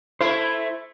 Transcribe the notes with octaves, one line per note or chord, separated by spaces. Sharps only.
A3 E4 C5